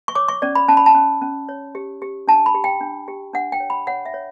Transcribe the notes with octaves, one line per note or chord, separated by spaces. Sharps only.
C#6
C#5 D6
C#6
C#4 D5
B5
C#4 A5
B5
A5
C#4
C#4
C#5
G4
G4
D4 A5
B5
G4
G5
D4
G4
D4 F#5
G5
C#5
B5
C#5 F#5
E5
C#5